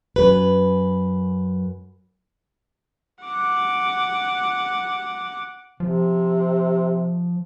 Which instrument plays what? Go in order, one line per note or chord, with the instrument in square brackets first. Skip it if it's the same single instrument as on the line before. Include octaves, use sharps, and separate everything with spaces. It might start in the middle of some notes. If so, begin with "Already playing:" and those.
[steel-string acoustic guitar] F#2 B4
[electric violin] F#5 D6
[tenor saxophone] C3 [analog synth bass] F3